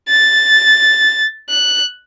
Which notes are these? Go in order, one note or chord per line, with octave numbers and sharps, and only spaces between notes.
A6
F#6